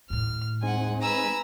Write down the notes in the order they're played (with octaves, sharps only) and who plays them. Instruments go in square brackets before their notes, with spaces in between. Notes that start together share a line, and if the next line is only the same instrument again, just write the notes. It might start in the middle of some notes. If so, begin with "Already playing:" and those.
[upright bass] D#2 A2 [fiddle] F6
[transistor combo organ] G#3 C4 D#4 [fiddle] F#5 G#5
[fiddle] B4 G#5 [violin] A#5 E6